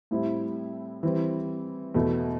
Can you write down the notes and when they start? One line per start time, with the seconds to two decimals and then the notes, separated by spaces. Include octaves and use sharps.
0.11 A2 G3 C4 E4
1.03 E3 G3 C4
1.94 E2 B2 A3 E4